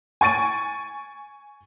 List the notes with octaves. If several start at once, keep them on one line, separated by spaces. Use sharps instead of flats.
G#5 C#6 A6 D7 D#7